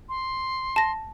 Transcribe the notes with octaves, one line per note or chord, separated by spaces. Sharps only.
C6
A5 A#6